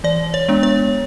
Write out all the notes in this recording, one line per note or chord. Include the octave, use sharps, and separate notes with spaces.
E3 D5
C#5
G#3 B3 D4
C#5